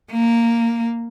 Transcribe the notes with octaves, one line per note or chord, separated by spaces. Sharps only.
A#3